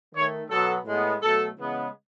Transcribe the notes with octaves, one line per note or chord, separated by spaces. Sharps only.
D#3 A3 C#5
B2 F#3 B3 A4
A2 G#3 B3
B2 F#3 A3 A4
C#3 E3 G#3 B3